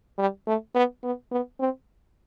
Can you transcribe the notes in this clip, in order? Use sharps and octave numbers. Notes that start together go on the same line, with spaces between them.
G3
A3
B3
B3
B3
C4